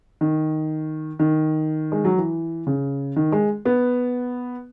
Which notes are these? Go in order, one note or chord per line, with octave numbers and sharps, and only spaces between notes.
D#3
D#3
G#3
F#3
E3
C#3
D#3
G#3
B3